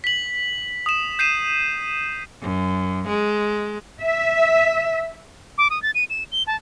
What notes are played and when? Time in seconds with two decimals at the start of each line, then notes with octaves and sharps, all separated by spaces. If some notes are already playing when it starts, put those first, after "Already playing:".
0.04 B6 F#7
0.86 D#6 E7
1.19 G6 C7 D#7 E7
2.42 F#2
3.08 G#3
4.01 E5
5.58 D6
5.70 D#6
5.83 A6
5.95 D#7
6.10 E7
6.32 G7
6.47 A5